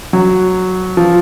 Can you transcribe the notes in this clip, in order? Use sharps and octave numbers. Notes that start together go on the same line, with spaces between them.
F#3
F3